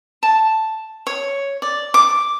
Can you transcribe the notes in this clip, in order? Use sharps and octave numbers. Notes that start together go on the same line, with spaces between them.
A5
C#5
D5
D6